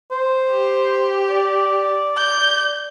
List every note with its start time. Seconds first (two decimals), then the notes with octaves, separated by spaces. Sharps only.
0.12 C5
0.50 G4
1.30 D5
2.17 G6